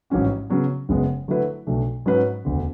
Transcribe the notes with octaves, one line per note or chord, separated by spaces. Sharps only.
A1 G#2 F#3 C#4 F#4
C#3 F#3 B3
F#1 F#2 C#3 G#3 B3
D3 F#3 A3 E4 B4
B1 B2 A3 D4
G#2 F#3 C#4 F#4 B4
E1 D2 D3